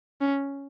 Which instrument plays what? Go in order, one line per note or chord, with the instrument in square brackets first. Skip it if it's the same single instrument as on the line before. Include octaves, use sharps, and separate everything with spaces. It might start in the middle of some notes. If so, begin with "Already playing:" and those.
[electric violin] C#4